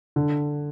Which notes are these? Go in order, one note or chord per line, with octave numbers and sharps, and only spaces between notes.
D3